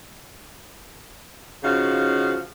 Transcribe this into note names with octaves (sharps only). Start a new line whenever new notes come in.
C#3 F3 D#4 F#4 F5